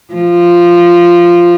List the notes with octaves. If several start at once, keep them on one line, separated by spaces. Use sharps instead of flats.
F3